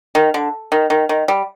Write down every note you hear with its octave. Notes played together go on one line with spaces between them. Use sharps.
D#3
D3
D#3
D#3
D#3
G3